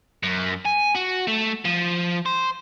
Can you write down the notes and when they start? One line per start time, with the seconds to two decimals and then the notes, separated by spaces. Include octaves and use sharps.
0.23 F#2
0.65 G#5
0.95 F#4
1.27 A3
1.65 F3
2.26 C5